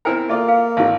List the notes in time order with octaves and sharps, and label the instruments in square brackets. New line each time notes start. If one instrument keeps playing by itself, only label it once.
[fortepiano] C4 E4 A#4 [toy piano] C5 G5 G#5
[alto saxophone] A#3 [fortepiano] F4 D5 [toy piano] A4 E5
[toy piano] G#4 B4 F5
[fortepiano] G#1 E3 [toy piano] F5